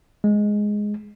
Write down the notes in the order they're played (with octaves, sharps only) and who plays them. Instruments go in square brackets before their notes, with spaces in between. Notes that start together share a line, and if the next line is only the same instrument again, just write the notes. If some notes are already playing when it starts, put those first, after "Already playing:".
[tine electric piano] G#3